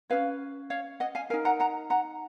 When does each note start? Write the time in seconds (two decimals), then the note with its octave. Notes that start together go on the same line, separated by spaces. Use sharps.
0.10 C#4 G#4 B4 C#5 F5
0.70 C#5 F5
1.00 D#5 F#5
1.15 F5 G#5
1.30 A#4 F5 G#5
1.33 D#4
1.45 F#5 A#5
1.60 F#5 A#5
1.90 F#5 A#5